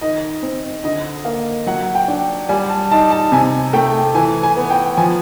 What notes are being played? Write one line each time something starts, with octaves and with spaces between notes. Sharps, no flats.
D#3 D#5
C4
D3 D#5
A#3 F5
F#3 F#5
G5
D4
G3 G#5
A5
D#4 A5
A5
C3 G#5
A3 G5
E3 G#5
G#5
B3
G5
F3 G#5